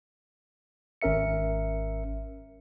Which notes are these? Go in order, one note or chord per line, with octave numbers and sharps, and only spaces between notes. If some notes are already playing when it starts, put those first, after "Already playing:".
G#1 C#4 A#4 E5 C#7